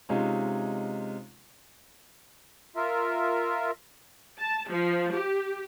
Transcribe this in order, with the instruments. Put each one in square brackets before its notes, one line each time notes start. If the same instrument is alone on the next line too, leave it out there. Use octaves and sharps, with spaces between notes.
[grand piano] C3 G#3 C#4 D#4 F4
[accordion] F4 A#4 E5
[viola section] A5
F3
G4